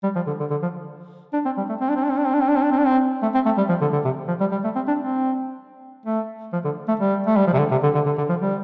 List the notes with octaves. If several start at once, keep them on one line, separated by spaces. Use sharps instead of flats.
G3
F3
D3
D3
D3
F3
D4
C4
G3
A3
C4
D4
C4
D4
C4
D4
C4
D4
C4
D4
C4
D4
C4
D4
C4
A3
C4
A3
G3
F3
D3
D3
C3
F3
G3
G3
A3
C4
D4
C4
A3
F3
D3
A3
G3
A3
G3
F3
C3
D3
C3
D3
D3
D3
D3
F3
G3